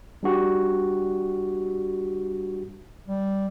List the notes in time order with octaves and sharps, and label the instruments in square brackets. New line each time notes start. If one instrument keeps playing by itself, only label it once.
[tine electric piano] G3 D4 F#4 G4
[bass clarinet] G3